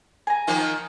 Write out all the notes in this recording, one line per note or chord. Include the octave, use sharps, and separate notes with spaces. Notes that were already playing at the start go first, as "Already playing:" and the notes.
G#5 A#5
D#3 F3 A#3